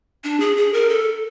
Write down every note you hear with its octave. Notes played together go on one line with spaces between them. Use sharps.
D4
G#4
G#4
A#4
A4